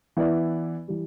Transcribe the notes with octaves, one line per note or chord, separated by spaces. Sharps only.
E3 B3 E4 B4 D5
E3 G3